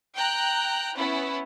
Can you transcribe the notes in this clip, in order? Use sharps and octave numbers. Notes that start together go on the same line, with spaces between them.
G5 A#5 F#6
B3 C#4 E4